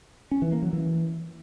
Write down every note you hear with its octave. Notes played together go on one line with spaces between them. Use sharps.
C#4
E3
A#3
F#3
E3